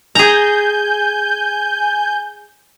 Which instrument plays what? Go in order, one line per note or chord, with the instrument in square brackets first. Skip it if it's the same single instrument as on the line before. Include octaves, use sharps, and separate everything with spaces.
[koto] G#4 A#5 [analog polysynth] G#5 G6